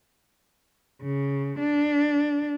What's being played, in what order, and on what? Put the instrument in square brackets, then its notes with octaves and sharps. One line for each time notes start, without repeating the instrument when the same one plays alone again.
[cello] C#3
D4